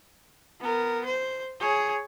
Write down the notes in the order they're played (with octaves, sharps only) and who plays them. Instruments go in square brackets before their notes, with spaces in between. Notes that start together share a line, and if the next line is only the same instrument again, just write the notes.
[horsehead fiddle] B3 A#4
C5
G#4 C#5